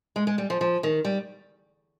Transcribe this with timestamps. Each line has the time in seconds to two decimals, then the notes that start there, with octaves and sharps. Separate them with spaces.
0.16 G#3
0.27 G#3
0.38 G3
0.50 F3
0.61 F3
0.83 D#3
1.05 G3